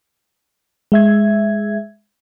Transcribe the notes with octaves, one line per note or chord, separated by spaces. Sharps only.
G#3 E5 G#6